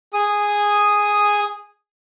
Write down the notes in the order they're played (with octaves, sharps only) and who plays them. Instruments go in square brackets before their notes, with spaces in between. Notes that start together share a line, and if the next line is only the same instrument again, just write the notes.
[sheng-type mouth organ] G#4 D#6